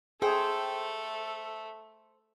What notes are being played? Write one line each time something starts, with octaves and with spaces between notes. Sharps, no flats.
A3 G#4 A4 C5 G5